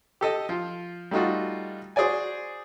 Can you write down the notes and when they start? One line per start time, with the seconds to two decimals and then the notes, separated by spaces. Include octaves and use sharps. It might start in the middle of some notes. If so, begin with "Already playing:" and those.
0.21 G4 A4 D#5
0.49 F3 F4
1.11 G3 A3 D#4 F4 F#4
1.96 F#4 G#4 C5 D5 G#5